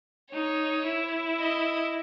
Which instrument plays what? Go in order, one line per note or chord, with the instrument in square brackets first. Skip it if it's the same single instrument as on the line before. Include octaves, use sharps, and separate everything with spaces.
[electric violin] D#4 [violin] C#5
[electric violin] E4
[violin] D#5